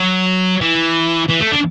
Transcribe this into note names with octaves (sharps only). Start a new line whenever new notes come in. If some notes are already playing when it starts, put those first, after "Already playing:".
Already playing: F#3
E3
E3
A3
D4